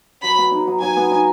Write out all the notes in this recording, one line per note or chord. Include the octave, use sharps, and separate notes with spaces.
F#3 B5
B3
D#4
F#3
F#3 G#5
B3
D#4